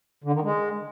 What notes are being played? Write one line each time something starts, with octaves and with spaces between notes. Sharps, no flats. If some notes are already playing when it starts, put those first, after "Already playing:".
D3
D#3
G#3